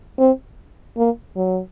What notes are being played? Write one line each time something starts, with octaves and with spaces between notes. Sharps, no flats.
C4
A#3
F#3